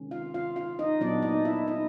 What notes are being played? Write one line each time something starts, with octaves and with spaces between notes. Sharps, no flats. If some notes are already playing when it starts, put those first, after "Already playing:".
Already playing: C3 D#3 G#3 C#4
F4 F5
F4 F5
F4 F5
D#4 D#5
A#2 F#3 B3 D4 D5
D#4 D#5
E4 E5
D#4 D#5